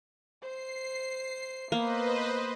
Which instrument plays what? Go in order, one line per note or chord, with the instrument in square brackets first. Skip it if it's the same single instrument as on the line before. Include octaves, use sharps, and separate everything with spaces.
[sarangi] C5 [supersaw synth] C7
[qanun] A#3 [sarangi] B3 [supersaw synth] B4 C5 D#5